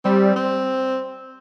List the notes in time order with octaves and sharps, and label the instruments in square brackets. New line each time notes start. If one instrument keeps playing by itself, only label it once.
[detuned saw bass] G3 [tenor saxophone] C4
[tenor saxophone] C4